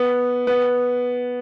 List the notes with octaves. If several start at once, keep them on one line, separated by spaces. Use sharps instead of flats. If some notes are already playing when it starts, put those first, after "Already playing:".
Already playing: B3
B3